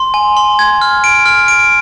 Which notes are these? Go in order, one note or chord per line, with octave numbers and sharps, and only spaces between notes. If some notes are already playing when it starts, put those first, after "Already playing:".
Already playing: C6
G#5
C6
G#6
F6
D7
F6
D7